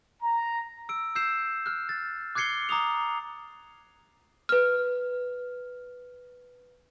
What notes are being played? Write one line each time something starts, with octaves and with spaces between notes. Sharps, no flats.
A#5
E6 D7
E6 G6 C7 E7
F6 F#6
A6
D6 F#6 G#6 C7 C#7 G7
A#5 D6 D#6 F7
B4 F6